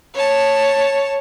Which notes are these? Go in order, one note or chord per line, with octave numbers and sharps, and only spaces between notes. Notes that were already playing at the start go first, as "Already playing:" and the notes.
C#5 A5